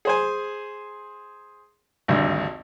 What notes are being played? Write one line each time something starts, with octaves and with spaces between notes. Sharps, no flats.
G#4 C5 G#5
G#1 D2 G2